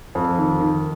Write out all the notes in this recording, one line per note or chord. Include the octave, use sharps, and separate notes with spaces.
F2
D#3
D#3